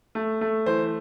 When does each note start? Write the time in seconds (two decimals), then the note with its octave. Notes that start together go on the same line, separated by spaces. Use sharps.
0.15 A3
0.41 A3
0.66 E3 C5